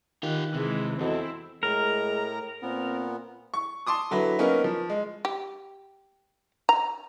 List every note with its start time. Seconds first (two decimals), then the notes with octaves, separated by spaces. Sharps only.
0.23 D#3 F4 G4 F#6
0.54 C3 E3 G#3
1.01 E2 C4 E4 F#4 A4 D#5
1.63 A2 G#3 A#4 A#5
2.62 A#2 B3 C4
3.54 C#6
3.86 A5 C6 D6 D#6
4.11 D3 F#3 E4 B4
4.39 A#3 B3 C#4 D#4 A#4
4.64 F3
4.90 G#3
5.25 G4
6.69 A#5